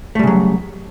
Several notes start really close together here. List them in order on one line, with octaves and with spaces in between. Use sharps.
A3 G3 C#3 F#3